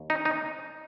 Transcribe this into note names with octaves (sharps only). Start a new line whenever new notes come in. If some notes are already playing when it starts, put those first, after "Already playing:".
Already playing: D#2
D#4
D#4